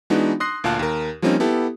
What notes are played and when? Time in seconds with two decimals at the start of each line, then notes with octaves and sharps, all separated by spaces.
0.10 E3 G#3 B3 D4 D#4 F#4
0.40 C6 D#6 F#6 A#6 C7
0.64 D2 A#2 F5 A5 F#6
0.79 D#2 A#4
1.22 F3 G3 A#3 C4 C#4 D#4
1.40 B3 E4 G4 A4